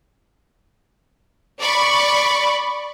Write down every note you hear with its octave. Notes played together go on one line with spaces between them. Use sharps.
D5 B5 C#6